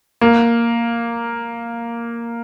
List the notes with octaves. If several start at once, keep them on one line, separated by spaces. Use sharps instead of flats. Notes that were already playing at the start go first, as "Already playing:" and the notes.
A#3